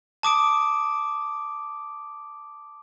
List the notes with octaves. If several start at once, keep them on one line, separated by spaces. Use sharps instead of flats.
A5 D6 D#6 D7